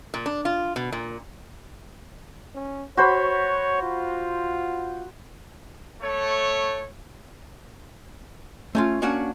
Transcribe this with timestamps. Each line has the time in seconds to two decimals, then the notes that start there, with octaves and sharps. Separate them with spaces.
0.14 A#2
0.26 D4
0.45 F4
0.76 B2
0.92 A#2
2.55 C#4
2.97 F#4 C5 C#5 B5
3.82 F4
6.01 A3 C#5
8.75 A3 C#4 F4
9.02 A#3 C#4 D4 F#4 F#5 A5